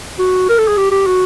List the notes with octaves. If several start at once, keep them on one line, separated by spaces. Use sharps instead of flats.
F#4
A#4
A4
G#4
G4
G4
F#4